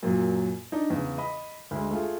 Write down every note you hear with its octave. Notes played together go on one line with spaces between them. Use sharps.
F#2 A#2 F#3
D4 D#4
E2 C#3
D#5 B5
D2 G#3
A3 F4 G#4